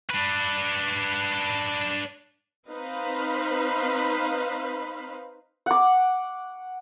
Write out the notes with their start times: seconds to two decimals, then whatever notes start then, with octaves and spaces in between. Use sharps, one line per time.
0.10 D4 B4
2.69 C4 D#4 B4 C5 F5 B5
5.66 F#5 D6